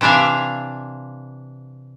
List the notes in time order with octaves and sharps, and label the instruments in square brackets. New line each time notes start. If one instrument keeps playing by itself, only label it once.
[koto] C3 E3 D4 E5 F5